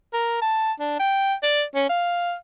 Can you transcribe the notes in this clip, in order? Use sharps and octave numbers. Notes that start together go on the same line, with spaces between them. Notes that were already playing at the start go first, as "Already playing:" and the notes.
A#4
A5
D4
G5
D5
C#4
F5